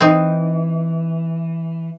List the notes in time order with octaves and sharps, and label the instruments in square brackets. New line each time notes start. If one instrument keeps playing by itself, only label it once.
[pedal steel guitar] E3 [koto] C4 D#4